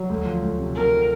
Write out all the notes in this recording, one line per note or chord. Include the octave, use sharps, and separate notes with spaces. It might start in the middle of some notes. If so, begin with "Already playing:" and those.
Already playing: F#3
D2
F3
D2
C3
C3 A#4